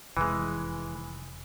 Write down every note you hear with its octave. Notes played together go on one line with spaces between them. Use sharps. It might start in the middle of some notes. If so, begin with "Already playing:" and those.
F1 E3 G#3